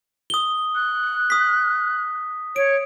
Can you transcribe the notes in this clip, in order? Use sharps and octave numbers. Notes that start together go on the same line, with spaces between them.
D#6 G7
F#6
D#6 B6
C#5 D7